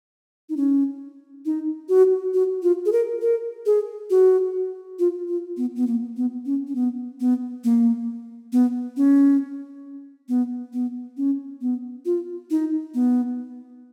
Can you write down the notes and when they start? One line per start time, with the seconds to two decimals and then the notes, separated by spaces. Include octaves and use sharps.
0.49 D#4
0.57 C#4
1.46 D#4
1.89 F#4
2.34 F#4
2.63 F4
2.86 G#4
2.92 A#4
3.22 A#4
3.66 G#4
4.10 F#4
4.99 F4
5.28 F4
5.57 B3
5.76 B3
5.87 A#3
6.17 B3
6.46 C#4
6.68 C#4
6.75 B3
7.20 B3
7.64 A#3
8.53 B3
8.97 C#4
10.29 B3
10.73 B3
11.17 C#4
11.61 B3
12.06 F4
12.51 D#4
12.94 B3